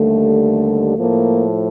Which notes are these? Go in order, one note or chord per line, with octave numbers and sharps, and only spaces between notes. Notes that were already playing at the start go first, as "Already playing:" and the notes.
Already playing: D#2 D3 G3 A3
A2 F3 A#3